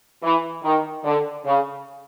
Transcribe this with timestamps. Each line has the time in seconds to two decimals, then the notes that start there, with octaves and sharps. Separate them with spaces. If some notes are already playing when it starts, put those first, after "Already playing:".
0.23 E3
0.64 D#3
1.04 D3
1.45 C#3